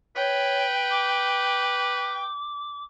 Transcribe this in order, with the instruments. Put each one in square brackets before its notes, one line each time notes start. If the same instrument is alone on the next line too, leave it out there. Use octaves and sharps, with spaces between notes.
[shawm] B4 [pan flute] C#5 [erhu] G5
[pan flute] D6